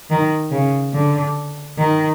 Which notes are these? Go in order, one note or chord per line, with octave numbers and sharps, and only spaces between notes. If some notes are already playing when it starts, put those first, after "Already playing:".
D#3
C#3
D3
D#3